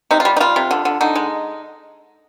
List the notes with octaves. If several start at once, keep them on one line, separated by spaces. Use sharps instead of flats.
C3 D#4
F4
G3
D#4
G3 F4
C3
D3
D3
D3 D#4
G#3